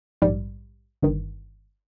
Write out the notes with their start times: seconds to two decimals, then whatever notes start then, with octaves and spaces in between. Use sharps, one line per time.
0.22 A#1 G#2 G3
1.02 G1 G2 D#3